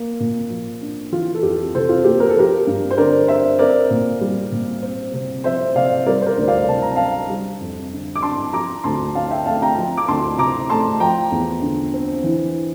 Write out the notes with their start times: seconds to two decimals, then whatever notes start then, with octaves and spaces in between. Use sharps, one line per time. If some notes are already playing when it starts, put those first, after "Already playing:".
Already playing: A#3
0.20 A#2
0.50 F3
0.81 D4
1.12 E3 F4
1.34 A4
1.43 F2 G4
1.75 C3 A4 C5
1.89 F4
2.04 A#3 G4
2.20 A#4
2.29 A4
2.36 F3 G4 A#4
2.67 G2
2.91 C5
2.97 D3 A#4 D5
3.28 C4 C5 E5
3.59 C4 A#4 D5
3.90 A#2
4.21 G3
4.52 A#2
4.83 C4
5.13 C3
5.44 F3 C5 E5
5.75 C3 D5 F5
6.06 G3 A#4 D5
6.22 C5
6.26 A#4 D5
6.37 D2
6.48 D5 F5
6.68 C3 A5
6.82 A#5
6.96 D4 F5 A5
7.29 G3
7.61 F2
7.92 D3
8.15 D6
8.22 D4 A5 C6
8.53 F3 A#5 D6
8.84 D2 A5 C6
9.15 D3 F5 A5
9.31 E5 G5
9.46 A3 F5 A5
9.62 G5 A#5
9.77 F3
9.97 D6
10.08 D2 A5 C6
10.38 C3 A#5 D6
10.70 A3 A5 C6
11.00 F3 G5 A#5
11.32 E2
11.62 D3
11.94 C4
12.24 E3